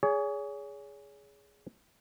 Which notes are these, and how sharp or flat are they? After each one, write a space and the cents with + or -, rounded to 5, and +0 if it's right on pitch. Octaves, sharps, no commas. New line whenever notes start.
G#4 +0 C#5 +35